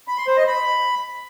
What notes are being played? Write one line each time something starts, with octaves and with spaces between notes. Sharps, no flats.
B5
C6
C5
D#5
B5